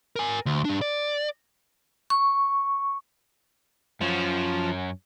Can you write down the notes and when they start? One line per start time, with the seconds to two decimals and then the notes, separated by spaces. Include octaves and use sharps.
0.16 A#4 G#5
0.46 D2
0.65 G2 D4
0.82 D5
2.10 C#6
4.01 F#2 F3 C#4